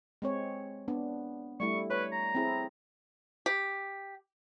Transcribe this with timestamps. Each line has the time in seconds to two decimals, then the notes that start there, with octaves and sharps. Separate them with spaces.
0.22 G#3 C4 C#5
0.88 B3 D4
1.60 G3 A3 E4 C#6
1.90 B4 C#5
2.12 A#5
2.35 C4 E4 G#4
3.46 G4